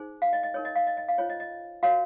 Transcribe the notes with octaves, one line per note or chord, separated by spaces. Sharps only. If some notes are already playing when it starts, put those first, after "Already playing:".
Already playing: D#4 G#4 C5
F5
D#5
D#5
D#4 A#4 C#5
D#5
F5
D#5
D#5
F5
F4 C5 C#5
D#5
D#5
F#4 A#4 C#5 F5